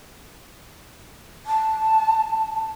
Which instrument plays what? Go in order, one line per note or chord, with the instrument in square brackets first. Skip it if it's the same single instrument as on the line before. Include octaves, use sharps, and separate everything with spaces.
[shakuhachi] A5